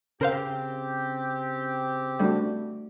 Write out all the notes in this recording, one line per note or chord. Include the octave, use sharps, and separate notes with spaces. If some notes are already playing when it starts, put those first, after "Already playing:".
C#3 C4 G4 A#4 C5 F5
G3 A3 D4 F#4